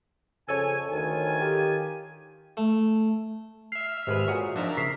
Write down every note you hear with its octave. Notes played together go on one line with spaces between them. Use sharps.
F2 C#3 A4 C#5 G#5
D2 D#3 F4 G#5
G4
A3
E5 F6 C7
G#1 C3 G#3 B4
A#2 F#4 G#4 C#5
F3 D4 D#4 E5 A#5
C#3 A#4 B6 C7